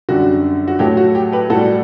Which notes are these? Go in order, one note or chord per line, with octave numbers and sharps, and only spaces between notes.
F#2 D3 G3 F#4
F#4
A2 F#3 A3 G4
F#4
G4
G4 B4
A2 G3 F#4 A4